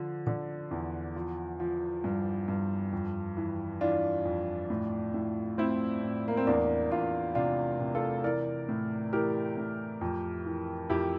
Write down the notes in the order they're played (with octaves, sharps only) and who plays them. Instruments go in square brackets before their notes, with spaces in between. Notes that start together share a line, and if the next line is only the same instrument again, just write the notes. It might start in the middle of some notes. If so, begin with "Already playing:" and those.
Already playing: [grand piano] D3 F3
D3
E2
F3
F3
G2
G2
F2
E3
E3 D4 F4
F2
A2
A2
A2 C4 E4
A2
A#3
C4
E2 A#3 D4
E2 D4 F4
C3 D4 F4
C3
F4 A4
E3 A#4 D5
A2
E3 G4 A#4
A2
F2
E3
F2 E4 G4